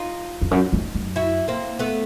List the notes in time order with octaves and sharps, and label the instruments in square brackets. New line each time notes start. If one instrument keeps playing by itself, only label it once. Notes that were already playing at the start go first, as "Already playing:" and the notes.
Already playing: [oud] D#4 F4
[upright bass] F2
F#2
F2
F#2
[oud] E4 F#4
A#3 C4
A3 B3